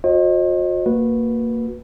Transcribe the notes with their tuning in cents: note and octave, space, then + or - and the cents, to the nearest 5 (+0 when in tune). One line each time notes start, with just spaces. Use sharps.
F#4 -45 C5 +45 D#5 +0
A#3 -15 F#4 -20 B4 -10